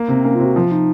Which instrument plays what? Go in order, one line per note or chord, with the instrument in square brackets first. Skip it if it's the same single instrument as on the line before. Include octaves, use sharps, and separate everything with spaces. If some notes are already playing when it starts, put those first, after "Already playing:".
Already playing: [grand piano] A#3
C3
[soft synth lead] C4
[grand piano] A#3 [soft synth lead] C#4
[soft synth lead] F4
[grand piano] C3
[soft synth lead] F#4
[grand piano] F3 [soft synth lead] F4
[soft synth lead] D#4